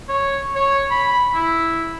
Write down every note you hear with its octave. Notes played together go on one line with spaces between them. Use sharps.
C#5
C#5
B5
E4